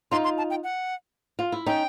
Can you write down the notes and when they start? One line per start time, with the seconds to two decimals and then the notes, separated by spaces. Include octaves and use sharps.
0.11 D#4 F4 C6
0.24 C6
0.38 A5
0.50 G5
0.63 F#5
1.39 F4
1.52 E4
1.66 C#4 D#4 G5